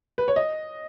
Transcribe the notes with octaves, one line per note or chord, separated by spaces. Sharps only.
B4
C#5
D#5